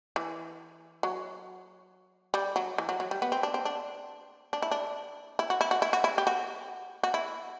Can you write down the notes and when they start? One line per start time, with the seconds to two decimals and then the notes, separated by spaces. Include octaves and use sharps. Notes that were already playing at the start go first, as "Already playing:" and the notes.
0.16 E3
1.03 F#3
2.34 G3
2.56 F#3
2.78 E3
2.89 F#3
3.00 F#3
3.11 G3
3.22 B3
3.32 C4
3.43 D4
3.54 C4
3.65 D4
4.53 D4
4.62 E4
4.71 D4
5.39 E4
5.50 F#4
5.61 E4
5.71 F#4
5.82 E4
5.93 F#4
6.04 E4
6.18 G4
6.27 F#4
7.03 F#4
7.14 E4